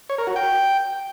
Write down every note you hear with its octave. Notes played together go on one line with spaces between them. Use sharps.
C#5
A#4
F#4
G5